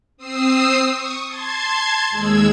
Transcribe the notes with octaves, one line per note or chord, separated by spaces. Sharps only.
C4 D#6 E6 C7
C#6 D#6
A5 C6 G#6
D#2 G#3 G#4 E6 G#6